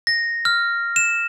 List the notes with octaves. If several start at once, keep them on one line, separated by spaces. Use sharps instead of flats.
A#6
F6
E7